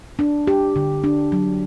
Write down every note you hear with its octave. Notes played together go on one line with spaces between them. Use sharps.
D4
G4
D3
D4
F#3